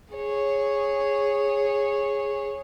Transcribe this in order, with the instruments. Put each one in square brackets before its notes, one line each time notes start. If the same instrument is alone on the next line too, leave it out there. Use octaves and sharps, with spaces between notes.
[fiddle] G#4 C#5